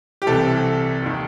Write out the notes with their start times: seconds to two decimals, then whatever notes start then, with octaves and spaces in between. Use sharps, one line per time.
0.22 G4
0.26 C2 C3 E3 A4
1.02 D#2 D#3